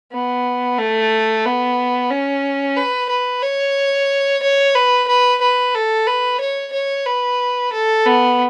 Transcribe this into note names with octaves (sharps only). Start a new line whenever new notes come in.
B3
A3
B3
C#4
B4
B4
C#5
C#5
B4
B4
B4
A4
B4
C#5
C#5
B4
A4
B3